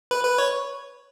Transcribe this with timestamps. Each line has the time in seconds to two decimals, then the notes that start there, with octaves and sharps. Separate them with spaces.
0.11 B4
0.24 B4
0.38 C#5